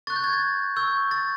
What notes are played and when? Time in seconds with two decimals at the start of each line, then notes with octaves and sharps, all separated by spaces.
0.07 C#6 F#6 A6
0.16 G6
0.24 G#6
0.33 A6
0.76 C#6 E6 G6
1.11 A6